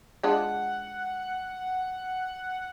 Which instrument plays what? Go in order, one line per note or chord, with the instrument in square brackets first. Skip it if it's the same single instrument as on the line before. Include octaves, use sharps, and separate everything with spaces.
[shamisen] G#3 D4 F4 [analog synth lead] F#5